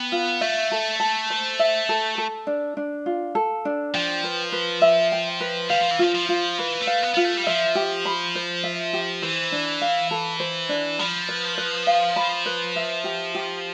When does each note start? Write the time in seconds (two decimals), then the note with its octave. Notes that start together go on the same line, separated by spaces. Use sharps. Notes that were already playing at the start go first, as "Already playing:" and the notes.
Already playing: B3 G5
0.12 F4
0.41 A3 E5
0.71 A4
1.00 A5
1.30 C5
1.59 E5
1.89 A4
2.18 A4
2.47 D4
2.77 D4
3.06 F4
3.35 A4
3.65 D4
3.94 F3 G5
4.24 B4
4.52 B4
4.82 E5
5.12 G5
5.40 B4
5.70 G3 F5
5.81 F3
5.91 E3
5.99 F3 F4
6.14 F3
6.29 F4
6.58 E3 B4
6.80 A3
6.87 F5
7.03 B3
7.14 B3 F4
7.25 A3
7.37 G3
7.47 F3 E5
7.75 G4
8.05 B5
8.35 C5
8.64 E5
8.93 G4
9.22 E3 C5
9.52 D4
9.81 F5
10.11 A4
10.40 C5
10.69 D4
10.99 F3 B5
11.29 B4
11.58 B4
11.87 F5
12.16 B5
12.46 B4
12.76 E5
13.04 G4
13.35 G4